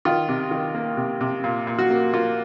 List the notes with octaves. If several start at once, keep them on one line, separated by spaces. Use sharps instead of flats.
D#3 F4
C3
D#3
A#3
C3
C3
A#2
A#2
F#4
A#3
A#3 F4